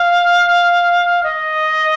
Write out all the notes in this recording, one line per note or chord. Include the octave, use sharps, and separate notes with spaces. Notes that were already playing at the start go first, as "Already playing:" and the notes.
Already playing: F5
D#5